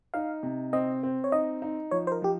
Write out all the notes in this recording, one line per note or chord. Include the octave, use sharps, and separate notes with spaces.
D#4 F5
C3
C4 D#5
C4
C#5
D#4 D#5
D#4
F3 C#5
C5
A#4
F3 G4